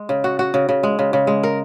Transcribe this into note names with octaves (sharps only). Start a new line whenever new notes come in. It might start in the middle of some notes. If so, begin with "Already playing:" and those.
Already playing: G#3
C#3
F#4
F#4
C#3
C#3
G#3
C#3
C#3
G#3
A#4